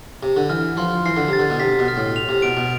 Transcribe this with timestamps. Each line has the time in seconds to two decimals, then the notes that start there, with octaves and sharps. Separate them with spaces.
0.23 C3
0.37 D3
0.50 E3 F6
0.77 F3 C6
1.06 E3 C7
1.17 D3
1.28 C3 A6
1.39 D3
1.50 B2
1.60 C3 B6
1.79 B2
1.88 F6
1.97 A2
2.16 F7
2.29 C3
2.42 B2 D7
2.57 B2